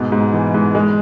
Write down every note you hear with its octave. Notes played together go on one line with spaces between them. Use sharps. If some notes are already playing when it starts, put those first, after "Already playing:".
Already playing: G#2 B2
G#2
E3
G#2
G#3